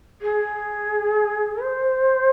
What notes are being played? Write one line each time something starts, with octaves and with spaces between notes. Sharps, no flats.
G#4
C5